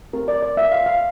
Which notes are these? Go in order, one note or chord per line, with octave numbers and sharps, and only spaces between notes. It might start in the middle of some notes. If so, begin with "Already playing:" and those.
A3 C4 G4 A#4
D5
D5
A#3 F4 E5
F5
F5